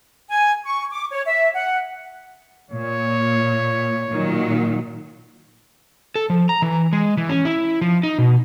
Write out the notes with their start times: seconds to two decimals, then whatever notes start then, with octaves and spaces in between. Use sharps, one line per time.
0.30 G#5
0.64 C#6
0.91 D6
1.10 C#5
1.26 E5
1.54 F#5
2.71 A#2 C#5
4.09 A#2 D#3 F#3
6.16 A4
6.30 F3
6.49 A#5
6.62 E3
6.93 G#3
7.17 E3
7.29 C#4
7.45 E4
7.81 F3
8.03 D#4
8.18 B2